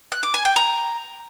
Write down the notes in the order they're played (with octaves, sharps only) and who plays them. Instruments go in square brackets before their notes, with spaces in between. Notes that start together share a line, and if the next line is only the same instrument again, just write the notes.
[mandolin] F#6
D6
G#5
G5
A#5